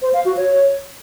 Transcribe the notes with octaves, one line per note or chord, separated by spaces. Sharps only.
C5
F5
F#4
C#5